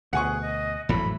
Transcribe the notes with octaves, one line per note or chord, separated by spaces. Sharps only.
D2 B2 G#4 F#5 G#5 C#6
D#5
G#1 F2 A2 E3 F#3 B5